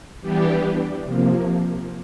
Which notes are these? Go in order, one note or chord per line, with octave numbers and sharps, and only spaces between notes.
E3 G3 B3 D4 G4
C3 F3 A#3